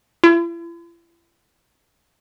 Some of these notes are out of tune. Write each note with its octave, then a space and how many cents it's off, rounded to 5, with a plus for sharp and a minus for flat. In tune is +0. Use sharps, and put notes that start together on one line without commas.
E4 +45